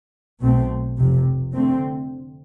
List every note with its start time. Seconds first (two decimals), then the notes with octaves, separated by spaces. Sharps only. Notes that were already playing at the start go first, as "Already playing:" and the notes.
0.41 B1 B2 A3 C4
0.97 F1 F2 C3
1.54 D3 A3 C4